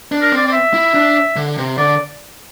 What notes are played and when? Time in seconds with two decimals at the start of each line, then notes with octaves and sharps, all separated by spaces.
0.12 D4
0.22 A#4
0.32 C4 D5
0.47 D5
0.53 E5
0.74 E4
0.94 D4
1.36 D3
1.58 C3
1.78 D3 D5